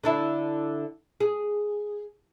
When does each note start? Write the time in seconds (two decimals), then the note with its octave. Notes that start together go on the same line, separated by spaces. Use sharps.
0.04 D3 D4 E4
1.20 G#4